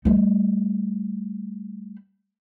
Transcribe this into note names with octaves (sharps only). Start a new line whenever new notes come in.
G3 A3